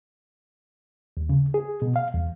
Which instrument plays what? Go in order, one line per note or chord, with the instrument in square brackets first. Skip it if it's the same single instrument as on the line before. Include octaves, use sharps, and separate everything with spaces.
[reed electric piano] D#2
C#3
G#4
B2
F5
E2